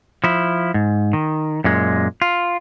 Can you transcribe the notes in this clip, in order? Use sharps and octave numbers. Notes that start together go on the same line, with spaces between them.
F3 E4
G#2
D#3
F#2 A#2 G#3
F4